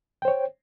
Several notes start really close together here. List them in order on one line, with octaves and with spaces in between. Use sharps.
G5 C5 C#5